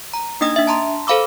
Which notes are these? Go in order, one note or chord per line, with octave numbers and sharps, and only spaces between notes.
A#5
A#3 D4 D#4 D#5 D#6 A#6
D4 E5
A5 A#5 C6
A4 C5 F5 B5 D6 E6